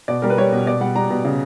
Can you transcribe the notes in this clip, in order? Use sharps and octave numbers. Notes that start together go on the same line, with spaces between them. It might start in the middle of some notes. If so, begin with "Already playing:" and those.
B2 D5
G3 A#4
B4
G3 C#5
B2
B2 D5
G3 F#5
G3 A#5
B2
C#3